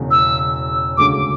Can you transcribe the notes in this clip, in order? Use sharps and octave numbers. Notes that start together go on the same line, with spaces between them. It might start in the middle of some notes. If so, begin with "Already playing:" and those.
Already playing: E1 E2 C#3 G#3
E6
D2 C#3 G#3 D6